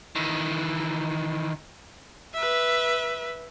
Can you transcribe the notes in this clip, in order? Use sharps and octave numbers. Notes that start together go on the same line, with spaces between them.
D#3 E3
B4 E5